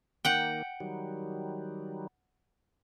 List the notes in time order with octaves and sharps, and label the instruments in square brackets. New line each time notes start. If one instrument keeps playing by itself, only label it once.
[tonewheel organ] D#3 A#3 [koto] F#5 G5
[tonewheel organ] D#3 F#3 G3